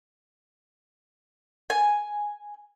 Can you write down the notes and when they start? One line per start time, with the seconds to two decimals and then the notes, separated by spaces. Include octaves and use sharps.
1.70 G#5